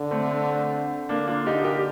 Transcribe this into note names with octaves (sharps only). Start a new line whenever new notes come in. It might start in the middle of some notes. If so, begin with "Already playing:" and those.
Already playing: D3
A3 C4
D3 A#3 D4
D4 F4
D#4 G4
G4 A#4